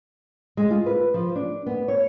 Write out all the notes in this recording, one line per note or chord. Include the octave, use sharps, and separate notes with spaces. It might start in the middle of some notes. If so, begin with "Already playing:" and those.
G#3
F4
B4
F3
D4
B3
C#5